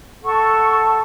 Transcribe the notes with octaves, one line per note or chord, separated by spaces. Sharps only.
A4 F#5 A5 C#6